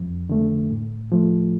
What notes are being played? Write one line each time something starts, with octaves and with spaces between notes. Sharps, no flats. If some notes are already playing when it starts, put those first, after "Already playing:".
Already playing: F2
D3 A3
A2
F3 A3